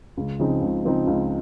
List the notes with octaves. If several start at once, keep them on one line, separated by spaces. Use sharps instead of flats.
C#2
C#3 F3 C4 D#4
C#2
C#3 F3 C4 D#4
C#2